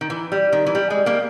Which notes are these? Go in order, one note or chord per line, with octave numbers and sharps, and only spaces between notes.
D#3
E3
G3
D#3
E3
G3
G#3
G3 A#3